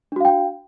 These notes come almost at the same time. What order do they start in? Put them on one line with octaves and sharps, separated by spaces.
D4 F#4 F5 G5